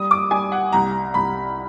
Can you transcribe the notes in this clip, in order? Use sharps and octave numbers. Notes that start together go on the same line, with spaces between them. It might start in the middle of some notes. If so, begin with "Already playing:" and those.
Already playing: G3 D#6
D6
G3 G#5
F#5
C2 A#5
C2 B5